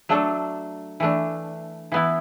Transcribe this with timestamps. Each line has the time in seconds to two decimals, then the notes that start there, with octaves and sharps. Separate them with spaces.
0.09 F#3 A3 D4 A4
1.00 E3 A3 D4
1.92 E3 B3 E4